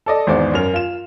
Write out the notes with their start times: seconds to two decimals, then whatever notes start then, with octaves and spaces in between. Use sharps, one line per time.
0.06 A4 D5 D#5
0.27 G#1 E2 G#2 C5 D5
0.53 F#2 A#4 F7
0.73 F4 E7